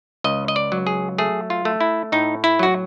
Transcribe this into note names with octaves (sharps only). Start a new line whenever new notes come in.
C#2 D#5
D#5
D5
F#3
G#4
A3 G#4
F4
A3
E4
A2 D#4
E4
F#3 F#4